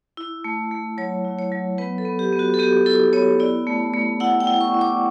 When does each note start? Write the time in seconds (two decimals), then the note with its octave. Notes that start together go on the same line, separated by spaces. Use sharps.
0.17 E4
0.44 A3
0.72 A3
0.98 F#3 C#5
1.25 E4
1.39 C#5
1.52 F#3
1.78 B3 B4
1.98 A4
2.05 B3
2.19 G4
2.32 B3
2.39 F#4
2.54 A4
2.59 B3 G4
2.86 E4 A4
3.13 B3 C#5
3.40 E4 D5
3.67 A3
3.94 A3
4.20 E4 F#5
4.40 G5
4.47 E4
4.61 C#6
4.74 E4
4.81 D6